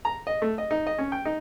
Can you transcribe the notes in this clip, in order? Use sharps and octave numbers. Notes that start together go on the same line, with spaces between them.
A#5
D#5
A3
D#5
D#4
D#5
C#4
G5
D#4